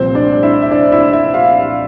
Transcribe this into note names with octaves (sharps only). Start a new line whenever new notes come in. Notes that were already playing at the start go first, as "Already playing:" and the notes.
Already playing: C2 A#2 F3 C4 C5
D4 D5
E4 E5
E5
D4 D5
E4 E5
E4 E5
F4 F5